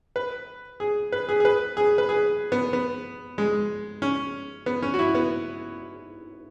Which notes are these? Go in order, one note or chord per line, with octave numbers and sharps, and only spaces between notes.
B4
G#4
B4
G#4
G#4
B4
G#4
B4
G#4
B3
B3
G#3
C#4
B3
C#4
F#4
E4
B3